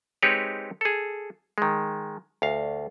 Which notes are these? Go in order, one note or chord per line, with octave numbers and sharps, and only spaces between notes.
G#3 C4 D#4 G4 B4 C#5
G#4 A4
D#3 G#3
D2 F5